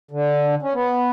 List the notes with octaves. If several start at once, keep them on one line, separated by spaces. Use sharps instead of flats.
D3
C#4
B3